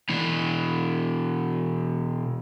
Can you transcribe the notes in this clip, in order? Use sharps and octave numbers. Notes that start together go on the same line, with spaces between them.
B2 E3